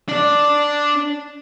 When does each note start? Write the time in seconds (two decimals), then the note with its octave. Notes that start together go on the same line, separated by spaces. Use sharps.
0.09 D4 D5